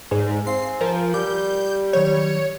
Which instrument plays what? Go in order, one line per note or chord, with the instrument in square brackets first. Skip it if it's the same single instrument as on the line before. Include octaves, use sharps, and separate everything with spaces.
[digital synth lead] G#2 [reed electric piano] G#4 D5 G#5
[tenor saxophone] C4 [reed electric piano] F5 G#5 [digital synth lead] C7
[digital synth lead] F3 [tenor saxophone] A#4
[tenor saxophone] G3 [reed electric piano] D6 [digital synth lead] G6
[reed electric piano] D#3 F#3 G6 [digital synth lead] C#5